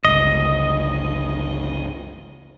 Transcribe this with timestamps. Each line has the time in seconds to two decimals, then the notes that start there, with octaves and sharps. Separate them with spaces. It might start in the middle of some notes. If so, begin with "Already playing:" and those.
0.05 G1 C#2 D#5